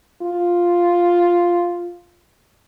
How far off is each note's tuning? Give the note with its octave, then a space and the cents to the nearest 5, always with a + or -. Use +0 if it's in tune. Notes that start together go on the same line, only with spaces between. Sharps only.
F4 +0